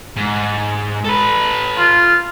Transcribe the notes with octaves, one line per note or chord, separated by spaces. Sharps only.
G#2
A4 B4
F4